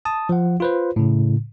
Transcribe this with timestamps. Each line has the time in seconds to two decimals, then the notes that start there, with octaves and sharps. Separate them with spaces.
0.05 A5 D#6
0.29 F3 F#5
0.60 F4 B4 C5
0.96 A2 C#3